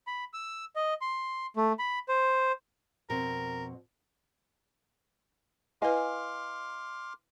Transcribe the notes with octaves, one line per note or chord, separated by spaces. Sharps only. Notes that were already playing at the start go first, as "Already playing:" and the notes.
B5
E6
D#5
C6
A3
B5
C5
F2 B2 C4 A#4
E4 B4 D#5 F5 G#5 C6 D6 F6